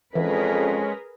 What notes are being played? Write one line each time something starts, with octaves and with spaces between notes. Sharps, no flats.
F2 E3 G#3 C#4 G#4 A#4 B4